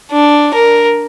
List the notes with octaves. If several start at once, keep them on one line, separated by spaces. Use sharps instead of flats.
D4
A#4